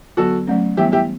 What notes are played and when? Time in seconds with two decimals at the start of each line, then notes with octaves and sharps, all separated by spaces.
0.17 D3 F#3 B3 F#4 A4
0.47 F#3 A3 C#4
0.77 E3 G3 B3 E4 G4
0.92 E4 G4